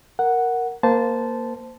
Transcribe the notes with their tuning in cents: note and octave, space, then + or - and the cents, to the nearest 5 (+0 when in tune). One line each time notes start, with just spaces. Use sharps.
A#4 +0 F#5 +0
A#3 +0 C5 -20 A5 -5